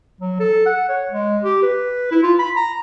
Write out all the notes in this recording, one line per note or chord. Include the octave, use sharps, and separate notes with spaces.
F#3
A4
F#5
C#5
G#3
G4
B4
E4
F4
B5
A#5